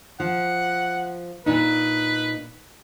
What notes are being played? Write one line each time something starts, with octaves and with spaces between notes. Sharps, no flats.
F3 F#5
A#2 D4 D#4 B4